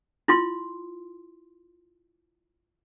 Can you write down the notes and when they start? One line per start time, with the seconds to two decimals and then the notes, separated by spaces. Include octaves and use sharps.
0.28 E4 F4 C6